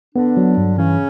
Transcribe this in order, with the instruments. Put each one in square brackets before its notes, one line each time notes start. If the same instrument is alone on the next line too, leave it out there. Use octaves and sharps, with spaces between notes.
[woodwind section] D3 D4 [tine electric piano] B3
[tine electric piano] F#3
G2
[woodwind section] C#3 C#4 [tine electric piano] E3